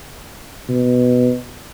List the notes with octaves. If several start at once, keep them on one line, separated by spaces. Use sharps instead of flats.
B2